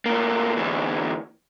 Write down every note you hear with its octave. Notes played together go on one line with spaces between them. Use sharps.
A2 A#3
D2 E3